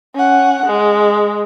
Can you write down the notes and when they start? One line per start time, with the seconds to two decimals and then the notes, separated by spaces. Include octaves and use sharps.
0.15 C#4 F#5
0.66 G#3